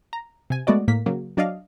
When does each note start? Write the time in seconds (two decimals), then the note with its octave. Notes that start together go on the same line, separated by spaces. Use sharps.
0.13 A#5
0.50 C3 G#5
0.67 G#3 A3 B3 F#4 D5 D#5
0.88 A2 A#3 B6
1.06 C#3 F#3 A#3
1.37 F#3 D4 D5 D#5 F5